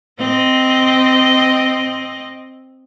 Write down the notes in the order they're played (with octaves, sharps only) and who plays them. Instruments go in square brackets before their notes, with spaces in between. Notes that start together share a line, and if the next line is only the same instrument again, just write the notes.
[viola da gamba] C4 D#5